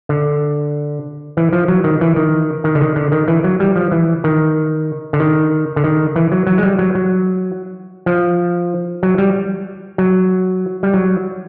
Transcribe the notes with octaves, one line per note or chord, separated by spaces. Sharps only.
D3
E3
F3
F#3
D#3
E3
D#3
D#3
D3
D#3
D3
D#3
E3
F#3
G3
F3
E3
D#3
D3
D#3
D3
D#3
E3
F#3
F#3
G#3
G3
F#3
F#3
F3
F#3
G3
F#3
G3
F#3